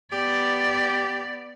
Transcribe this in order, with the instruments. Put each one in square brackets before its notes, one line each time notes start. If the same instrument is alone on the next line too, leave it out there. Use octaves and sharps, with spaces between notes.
[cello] B3 D5 [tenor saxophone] G4